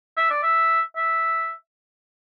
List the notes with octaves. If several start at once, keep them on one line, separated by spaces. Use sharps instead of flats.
E5
D5
E5
E5